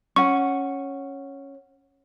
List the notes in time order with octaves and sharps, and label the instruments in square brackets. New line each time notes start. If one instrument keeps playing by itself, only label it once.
[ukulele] C#4 F#5 [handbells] C#6